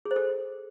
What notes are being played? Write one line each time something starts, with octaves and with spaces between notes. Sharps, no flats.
G#4
C5
A4